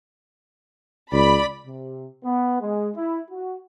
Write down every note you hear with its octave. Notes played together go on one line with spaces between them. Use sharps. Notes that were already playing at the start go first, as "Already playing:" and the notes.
C#2 D5 B5
C3
B3
G#3
E4
F#4